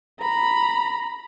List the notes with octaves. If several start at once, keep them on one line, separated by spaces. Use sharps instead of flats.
A#5 B5